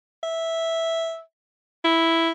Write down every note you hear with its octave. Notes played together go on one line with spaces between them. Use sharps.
E5
E4